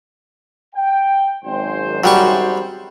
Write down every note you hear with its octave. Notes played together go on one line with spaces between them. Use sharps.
G5
G#1 F#2 C5
F#3 G3 C#6